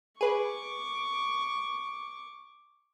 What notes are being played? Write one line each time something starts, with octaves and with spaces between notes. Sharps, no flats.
G#4 B4 C#6 D6